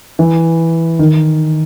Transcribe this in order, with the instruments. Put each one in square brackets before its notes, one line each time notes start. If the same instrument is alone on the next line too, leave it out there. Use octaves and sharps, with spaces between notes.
[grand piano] E3
D#3